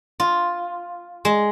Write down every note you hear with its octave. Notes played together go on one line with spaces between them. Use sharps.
F4
G#3